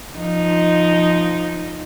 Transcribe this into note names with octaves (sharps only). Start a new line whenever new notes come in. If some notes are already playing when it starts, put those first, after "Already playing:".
F3 D#4